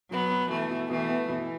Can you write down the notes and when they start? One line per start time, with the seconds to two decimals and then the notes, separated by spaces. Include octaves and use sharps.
0.11 B2 F#3 B3
0.31 B2
0.50 B2 E3 A3
0.69 B2
0.90 B2 E3 A3
1.09 B3
1.28 B2 E3